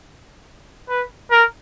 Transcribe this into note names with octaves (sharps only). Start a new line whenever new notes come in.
B4
A#4